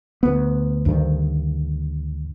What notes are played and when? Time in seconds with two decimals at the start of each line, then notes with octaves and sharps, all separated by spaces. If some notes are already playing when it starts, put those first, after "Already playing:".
0.23 D2 B3
0.86 D2 G2 D#3